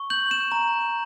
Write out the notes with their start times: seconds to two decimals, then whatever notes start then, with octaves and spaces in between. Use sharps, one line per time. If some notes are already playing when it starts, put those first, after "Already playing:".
Already playing: C#6
0.10 G6 F#7
0.31 E7
0.52 A#5